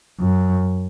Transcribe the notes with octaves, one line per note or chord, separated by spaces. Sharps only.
F#2